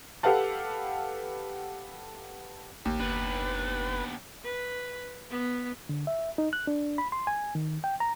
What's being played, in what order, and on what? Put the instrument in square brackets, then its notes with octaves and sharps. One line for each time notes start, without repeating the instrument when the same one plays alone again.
[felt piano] G4 A4 B4 F5 F#5 A5
[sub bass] A1 [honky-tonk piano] D#2
[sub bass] F#1 [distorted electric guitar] B3 D4 [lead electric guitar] B4
[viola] B4
B3
[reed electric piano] D3
E5
D#4
F#6
D4
B5
C6
G#5
D#3
G5
A#5